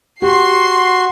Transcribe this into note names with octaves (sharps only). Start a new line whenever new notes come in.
F#4 G4 C6 C7